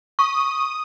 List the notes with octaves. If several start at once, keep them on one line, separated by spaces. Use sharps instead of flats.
C#6 D#6